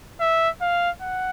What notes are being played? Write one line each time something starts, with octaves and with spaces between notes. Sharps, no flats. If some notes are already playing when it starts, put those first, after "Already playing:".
E5
F5
F#5